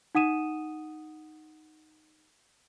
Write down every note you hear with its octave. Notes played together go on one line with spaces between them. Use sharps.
D#4 F#5 D#6 D#7 E7